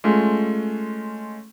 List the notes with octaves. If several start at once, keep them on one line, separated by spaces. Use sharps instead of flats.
G#3 A3 C#4 F4